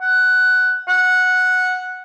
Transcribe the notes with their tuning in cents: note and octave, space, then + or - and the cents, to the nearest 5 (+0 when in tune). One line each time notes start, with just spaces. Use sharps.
F#5 +5
F#5 -10